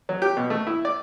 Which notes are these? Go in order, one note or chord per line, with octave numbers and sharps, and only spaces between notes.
F#3
G4
B2
A3
E4
D5